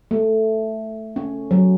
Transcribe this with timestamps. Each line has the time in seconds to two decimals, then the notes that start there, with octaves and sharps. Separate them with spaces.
0.11 A3
1.16 C#4
1.51 F#3